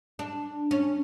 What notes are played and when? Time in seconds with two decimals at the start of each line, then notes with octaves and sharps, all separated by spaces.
0.19 D4
0.71 C#4